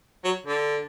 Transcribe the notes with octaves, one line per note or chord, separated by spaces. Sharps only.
F#3
D3